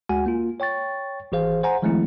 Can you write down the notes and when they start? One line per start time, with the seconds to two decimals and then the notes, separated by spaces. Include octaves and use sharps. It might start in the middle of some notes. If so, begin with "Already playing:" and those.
0.09 D2 G#3 F#4 F#5 G#5
0.26 A#3 F4
0.60 C#5 G5 C#6 A6
1.32 G#1 E3 G#4 C5 F5
1.63 C5 F#5 G#5 A#5
1.82 D#3 F3 G#3 A3 C4 E4